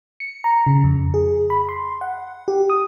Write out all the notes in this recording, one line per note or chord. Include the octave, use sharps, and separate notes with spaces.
C#7
A#5
C#3
F2
G#4
B5
C6
F#5
G4
D#6